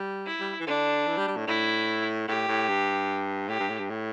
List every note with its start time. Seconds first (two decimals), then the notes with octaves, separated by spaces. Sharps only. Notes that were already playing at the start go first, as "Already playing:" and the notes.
Already playing: G3
0.27 E4
0.40 G3
0.60 E3
0.67 D3 D4
1.07 E3
1.17 G3
1.27 G3
1.37 A2
1.47 A2 E4
2.28 A2 G4
2.48 A2
2.69 G2
3.49 A2 G4
3.59 G2
3.69 A2
3.79 G2
3.90 A2